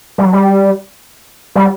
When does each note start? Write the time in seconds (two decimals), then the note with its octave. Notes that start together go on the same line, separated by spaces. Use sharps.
0.18 G3
0.25 F#3
0.33 G3
1.55 G3